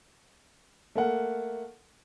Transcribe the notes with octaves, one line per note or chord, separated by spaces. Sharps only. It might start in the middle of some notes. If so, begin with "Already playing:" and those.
A3 A#3 F#5